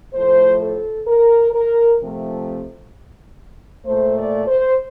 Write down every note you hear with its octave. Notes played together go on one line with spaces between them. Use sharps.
A2 F3 A3 C5
A4
A#4
A#4
C3 F3 A3
A#2 A3 C5
D5
C5